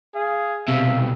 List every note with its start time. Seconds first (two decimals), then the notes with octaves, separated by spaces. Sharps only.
0.15 G#4 F5
0.68 B1 C3 E5 F5